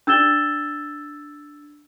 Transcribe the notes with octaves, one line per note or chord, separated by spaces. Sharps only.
D4 E6 G#6 A6 E7 G7